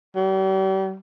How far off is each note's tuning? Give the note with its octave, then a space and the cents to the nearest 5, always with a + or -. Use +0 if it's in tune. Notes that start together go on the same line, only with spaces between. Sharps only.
G3 -40